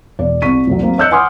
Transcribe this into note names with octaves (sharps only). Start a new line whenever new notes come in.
E1 D5
C2 C#6 B6 D#7
F1 C2 F#3
F#3 A#3 C4
C#5 D#5 E6 F#6 G6 C#7
F#5 G#5 C6 D6 D#6 F6